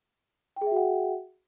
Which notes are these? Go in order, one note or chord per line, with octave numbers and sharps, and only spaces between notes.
F#4 G#4 E5 F#5 G5